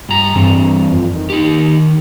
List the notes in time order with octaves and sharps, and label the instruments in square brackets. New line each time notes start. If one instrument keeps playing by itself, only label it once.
[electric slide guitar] G2 A#5
[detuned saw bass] G2 [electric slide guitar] E3 C4
[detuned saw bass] F2
D#3
[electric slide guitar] D#4 G4